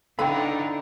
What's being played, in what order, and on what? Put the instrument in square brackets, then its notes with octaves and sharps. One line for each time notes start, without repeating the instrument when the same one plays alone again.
[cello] D3 [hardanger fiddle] D#4 E4 [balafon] A4 G5 [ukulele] B4 F5 B5